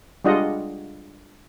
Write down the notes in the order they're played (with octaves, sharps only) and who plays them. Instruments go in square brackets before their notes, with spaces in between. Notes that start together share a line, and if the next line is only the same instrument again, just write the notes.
[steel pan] G3 G#3 D4 F4 D#5 F#5